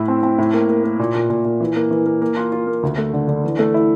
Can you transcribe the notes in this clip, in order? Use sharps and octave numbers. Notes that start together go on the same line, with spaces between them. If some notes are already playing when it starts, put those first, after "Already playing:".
Already playing: A2 E4
C4
C4
A2
A#3
A#3
A#3
A#2
A#2
A#2
A#2
E3
A#3
E3
A#3
A#3
F4
F4
A#3
D2
A3
D3
D3
E3
A3
E4